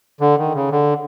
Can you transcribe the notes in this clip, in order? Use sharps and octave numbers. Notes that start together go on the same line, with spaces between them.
D3
D#3
C#3
D3